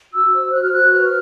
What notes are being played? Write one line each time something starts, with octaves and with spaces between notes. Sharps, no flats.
F#4 E6
C5
C5 F#6
F6
F#4 F#6
B4 F6